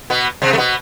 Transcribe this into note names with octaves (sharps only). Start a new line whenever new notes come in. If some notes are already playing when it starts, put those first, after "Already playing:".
B2 B3
C3 C4
A3
B2 B3